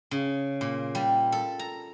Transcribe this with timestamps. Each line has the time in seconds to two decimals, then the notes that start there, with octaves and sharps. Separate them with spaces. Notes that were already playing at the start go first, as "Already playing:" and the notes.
0.11 C#3
0.61 A#2
0.95 G3
1.32 A4
1.59 A#5